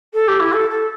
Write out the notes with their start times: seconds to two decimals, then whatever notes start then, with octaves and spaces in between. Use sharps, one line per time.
0.14 A4
0.28 G4
0.40 E4
0.53 A4
0.70 A4